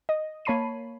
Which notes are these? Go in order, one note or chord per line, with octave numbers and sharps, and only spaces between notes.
D#5
A#3 C#5 A5 B5 C7 D#7